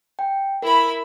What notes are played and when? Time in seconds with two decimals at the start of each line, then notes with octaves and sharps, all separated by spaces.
0.19 G5
0.62 E4 A#4 B5